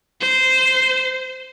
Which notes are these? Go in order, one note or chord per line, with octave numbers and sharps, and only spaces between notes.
C5